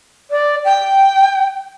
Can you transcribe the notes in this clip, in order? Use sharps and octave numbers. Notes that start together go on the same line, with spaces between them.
D5
G5